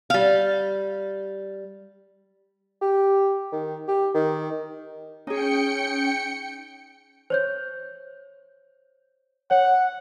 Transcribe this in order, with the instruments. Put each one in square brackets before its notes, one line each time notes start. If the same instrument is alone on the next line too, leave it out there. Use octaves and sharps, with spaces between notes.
[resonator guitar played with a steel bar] G3 F5
[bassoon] G4
D#3
G4
D#3
[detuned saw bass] C#4 [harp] D#4 G#4 [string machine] G5 C#7
[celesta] C5 C#5 G6
[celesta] C#5 [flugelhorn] F#5